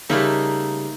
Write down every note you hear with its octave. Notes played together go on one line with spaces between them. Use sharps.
C#3 G3 A3 A#3 D#4 E5